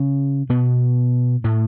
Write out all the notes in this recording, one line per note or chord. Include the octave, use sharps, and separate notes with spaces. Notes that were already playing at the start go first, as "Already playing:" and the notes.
Already playing: C#3 C#4
B2 B3
A2 A3